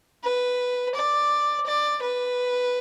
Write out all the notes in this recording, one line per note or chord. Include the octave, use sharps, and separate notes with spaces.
B4
D5
D5
B4